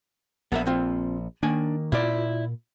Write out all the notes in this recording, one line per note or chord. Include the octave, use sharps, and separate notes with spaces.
A#1 B3 A#4 E5
C4 F4
D#3 A#3 D4 G#5
A#2 E4 F4 D5